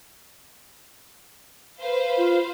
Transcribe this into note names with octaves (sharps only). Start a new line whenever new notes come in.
B4 C5 F5
F4